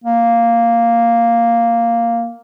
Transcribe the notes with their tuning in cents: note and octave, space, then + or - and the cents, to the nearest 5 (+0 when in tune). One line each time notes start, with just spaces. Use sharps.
A#3 -5